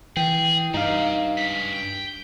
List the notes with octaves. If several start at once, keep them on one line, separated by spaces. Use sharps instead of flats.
E3 G#4 G5
G2 C3 D#4 F5
G#2 C#3 B6
G5